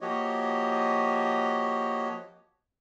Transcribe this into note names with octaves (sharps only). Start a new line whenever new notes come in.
F3 A#3 F#4 G4 C#5 D#5